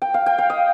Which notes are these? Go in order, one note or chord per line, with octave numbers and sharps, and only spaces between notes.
G5
F5
G5
F5
D#5